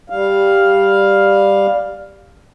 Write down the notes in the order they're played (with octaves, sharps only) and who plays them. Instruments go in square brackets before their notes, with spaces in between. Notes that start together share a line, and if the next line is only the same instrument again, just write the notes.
[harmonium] G3 F5